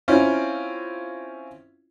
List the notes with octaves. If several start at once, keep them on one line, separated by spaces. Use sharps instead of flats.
C4 C#4 E4 F4